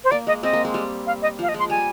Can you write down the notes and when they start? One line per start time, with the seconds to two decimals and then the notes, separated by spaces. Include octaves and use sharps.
0.04 C5
0.11 A#3 D5
0.27 G#3 D#5
0.43 G#3 C4 D#5
0.53 A#3
0.65 G#3
0.74 G3
1.07 F5
1.22 D#5
1.39 F3 F5
1.49 D#5
1.54 G#3 C6
1.70 G3 G#5